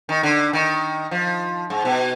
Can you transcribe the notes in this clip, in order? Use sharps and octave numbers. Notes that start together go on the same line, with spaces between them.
D#3
D3
D#3
F3
G#2
B2